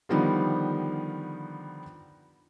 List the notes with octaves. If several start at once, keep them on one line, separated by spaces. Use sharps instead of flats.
D3 D#3 F3 G3 B3 D#4